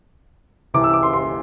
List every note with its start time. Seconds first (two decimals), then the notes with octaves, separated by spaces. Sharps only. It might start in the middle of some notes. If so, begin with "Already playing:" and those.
0.74 C2 C3 E3 D6
0.84 E6
0.93 D6
1.03 C6
1.13 C6